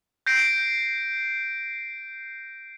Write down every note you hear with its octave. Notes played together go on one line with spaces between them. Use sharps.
G6 A#6 C7 D7